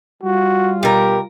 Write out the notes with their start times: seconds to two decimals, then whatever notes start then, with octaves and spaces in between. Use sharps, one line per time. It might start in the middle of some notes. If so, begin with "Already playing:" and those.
0.23 G3 F4 F#4
0.83 B2 G4 A#4